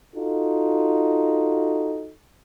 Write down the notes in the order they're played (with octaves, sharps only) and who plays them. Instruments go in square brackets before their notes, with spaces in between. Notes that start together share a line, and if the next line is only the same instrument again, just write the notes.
[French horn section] D#4 F4 F#4 A4